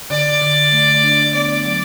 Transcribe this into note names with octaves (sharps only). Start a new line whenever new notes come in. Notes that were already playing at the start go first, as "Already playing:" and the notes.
D3 D5
D3
A3
D4
B3 D5
F#3